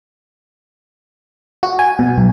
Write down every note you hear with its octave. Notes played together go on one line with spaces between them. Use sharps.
F#4
G#5
B2
B1